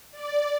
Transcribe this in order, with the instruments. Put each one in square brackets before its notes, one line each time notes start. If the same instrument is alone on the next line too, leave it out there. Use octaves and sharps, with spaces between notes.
[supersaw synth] D5